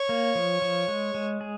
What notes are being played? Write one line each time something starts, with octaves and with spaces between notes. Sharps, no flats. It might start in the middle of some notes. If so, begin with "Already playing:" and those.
Already playing: C#5
A#3
F3
F3
G#3
G#3
G#4